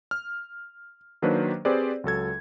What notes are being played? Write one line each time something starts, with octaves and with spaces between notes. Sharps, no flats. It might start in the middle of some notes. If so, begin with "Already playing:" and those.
F6
D#3 F#3 A#3 D4 B4 C5
C4 G4 G#4 B4 C5 D5
C#2 F#3 A4 G#6